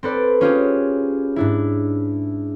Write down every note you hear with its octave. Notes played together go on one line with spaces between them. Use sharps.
C4 A4 B4 D5
C#4 F4 G4 G#4
G#2 D4 E4